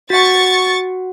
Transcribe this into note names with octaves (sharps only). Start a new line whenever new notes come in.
F#4 F#5 C#6 A6